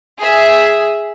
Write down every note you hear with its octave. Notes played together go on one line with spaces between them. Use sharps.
G#4 E5